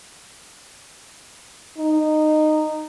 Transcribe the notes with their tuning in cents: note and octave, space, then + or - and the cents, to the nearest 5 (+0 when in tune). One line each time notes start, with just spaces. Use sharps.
D#4 -15